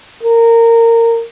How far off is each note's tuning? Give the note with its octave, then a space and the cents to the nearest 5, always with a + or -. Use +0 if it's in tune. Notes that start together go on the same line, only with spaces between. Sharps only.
A#4 -20